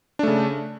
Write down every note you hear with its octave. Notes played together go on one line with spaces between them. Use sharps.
C#3 A3 D4